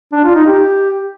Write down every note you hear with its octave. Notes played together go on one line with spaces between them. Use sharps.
D4
F4
D#4
G4